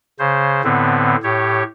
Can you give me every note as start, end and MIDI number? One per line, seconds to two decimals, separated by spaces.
0.19 0.62 49
0.19 0.62 72
0.64 1.16 45
0.64 1.16 50
0.64 1.16 59
0.64 1.16 60
1.23 1.63 45
1.23 1.63 67
1.23 1.63 73